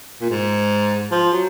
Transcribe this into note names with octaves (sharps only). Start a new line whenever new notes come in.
A#2
G#2
F3
F#3